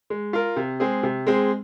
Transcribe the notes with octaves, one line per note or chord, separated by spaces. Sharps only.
G#3
F4 A#4
C3
G#3 C4 G#4
C3
G#3 C4 G#4